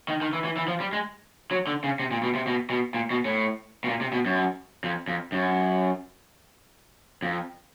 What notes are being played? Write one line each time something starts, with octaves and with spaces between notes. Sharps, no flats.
D#3
D#3
E3
E3
E3
F3
G3
G#3
F#3
D3
C#3
C3
A#2
B2
C3
B2
B2
A#2
B2
A2
B2
A#2
C3
B2
F#2
F2
F2
F#2
F2